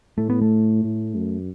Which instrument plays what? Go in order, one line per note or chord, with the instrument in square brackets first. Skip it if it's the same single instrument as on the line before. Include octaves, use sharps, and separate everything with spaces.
[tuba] A2 [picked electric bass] A3
[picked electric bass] B3
A3
[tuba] A2
F#2